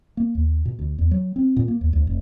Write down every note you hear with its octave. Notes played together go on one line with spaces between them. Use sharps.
A#3
D#2
B2
D2
E2
F#3
C4
A#2
A#3
D#2
D2
F1